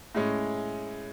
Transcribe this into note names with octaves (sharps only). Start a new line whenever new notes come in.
A2 G#3 C#4